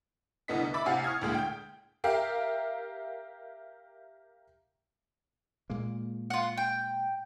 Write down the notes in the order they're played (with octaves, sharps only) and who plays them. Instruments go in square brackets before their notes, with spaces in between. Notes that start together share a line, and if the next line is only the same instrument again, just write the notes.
[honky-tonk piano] C2 D3 B3 D#5 B6
E5 B5 D6 A6
C3 F5 F#5 G#5
C#6 D#6 F6 G#6
D2 A#2 G#3
G5 G6
G4 A#4 E5 F5
[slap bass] A#2 G#3 A#3
[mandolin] F4 F#5
G5